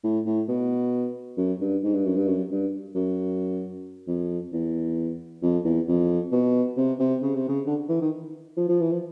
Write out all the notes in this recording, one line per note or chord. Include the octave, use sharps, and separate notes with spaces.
A2
A2
B2
F#2
G2
G#2
G2
F#2
G2
F#2
G2
F#2
F2
E2
F2
E2
F2
B2
C3
C3
C#3
C3
C#3
D3
E3
D#3
F3
F3
E3
F3